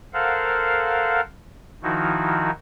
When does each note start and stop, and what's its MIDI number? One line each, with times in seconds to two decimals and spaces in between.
0.14 1.21 69
0.14 1.21 70
0.14 1.21 72
0.14 1.21 77
0.14 1.21 78
1.83 2.50 51
1.83 2.50 53
1.83 2.50 63
1.83 2.50 64
1.83 2.50 66